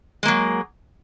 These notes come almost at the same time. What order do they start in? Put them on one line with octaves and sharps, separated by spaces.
G#3 A#3 F#3